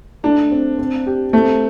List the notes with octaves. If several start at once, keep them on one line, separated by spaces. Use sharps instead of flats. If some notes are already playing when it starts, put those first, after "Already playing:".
A3 D4
C4
C4
G4
A3 C4